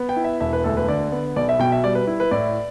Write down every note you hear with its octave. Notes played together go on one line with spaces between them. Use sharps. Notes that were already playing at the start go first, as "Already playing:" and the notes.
Already playing: B3
G5
E4
E5
E1 E5
B4
D2 A4
B4
D3 D5
B3
B1 D5
E5
B2 G5
E5
G3 D5
B4
E4
B4
A2 D5